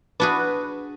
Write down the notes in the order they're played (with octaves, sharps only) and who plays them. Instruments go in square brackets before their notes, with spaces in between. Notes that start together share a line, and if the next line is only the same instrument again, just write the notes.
[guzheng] D4 F#4 G#4 [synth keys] B4